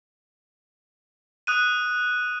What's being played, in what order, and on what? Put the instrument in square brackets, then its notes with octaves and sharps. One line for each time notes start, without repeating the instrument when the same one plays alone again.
[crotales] D#6 F#6 D#7